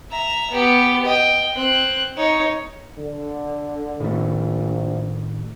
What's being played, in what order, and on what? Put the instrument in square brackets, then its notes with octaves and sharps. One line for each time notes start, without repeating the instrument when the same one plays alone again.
[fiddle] E5 A#5
B3 G4
D#5 G5
C4 F#6
D#4 C#5
[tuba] D3
[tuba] A#1 [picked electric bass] A2 D#3 A3